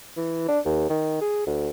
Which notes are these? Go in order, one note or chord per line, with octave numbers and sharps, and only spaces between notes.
E3
D4
D#2
D#3
G#4
D2